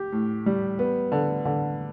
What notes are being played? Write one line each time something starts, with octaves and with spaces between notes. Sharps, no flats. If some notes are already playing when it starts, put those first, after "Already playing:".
Already playing: G4
A2
G3
B3
D3
D3